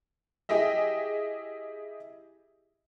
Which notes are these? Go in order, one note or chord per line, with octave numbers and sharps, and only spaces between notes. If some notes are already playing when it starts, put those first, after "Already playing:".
E4 G4 G#4 D#5 E5